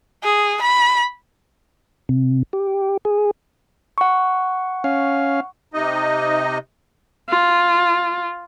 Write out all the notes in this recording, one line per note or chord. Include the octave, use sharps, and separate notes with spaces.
G#4
B5
C3
G4
G#4
F#5 C#6
C#4 F5
C3 D#4 D#5
F4